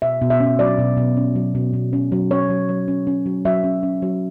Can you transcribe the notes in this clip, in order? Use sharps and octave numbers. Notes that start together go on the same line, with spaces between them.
B2 E5
B2
E5
C#4
F#3 D5
B2
B2
C#4
F#3
B2
B2
C#4
F#3
C#4 C#5
F#3
F#3
C#4
C#4
F#3
F#3 E5
C#4
C#4
F#3